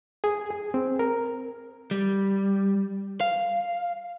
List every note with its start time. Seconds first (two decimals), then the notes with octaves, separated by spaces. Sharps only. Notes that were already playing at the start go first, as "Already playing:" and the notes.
0.24 G#4
0.50 G#4
0.74 C4
0.99 A#4
1.91 G3
3.21 F5